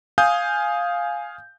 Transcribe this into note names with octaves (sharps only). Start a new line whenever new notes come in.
F5 G#5 D#6 G6